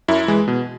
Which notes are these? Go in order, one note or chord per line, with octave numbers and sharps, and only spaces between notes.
F#2 E4
E3 G#3
B2